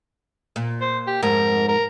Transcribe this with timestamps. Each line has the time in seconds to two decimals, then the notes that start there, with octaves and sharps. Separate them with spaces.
0.56 A#2
0.81 C5
1.07 G4
1.23 F2 G#2 A#4
1.68 A#4